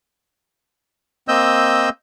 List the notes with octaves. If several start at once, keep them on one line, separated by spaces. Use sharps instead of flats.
A#3 C4 D#5 E6 G6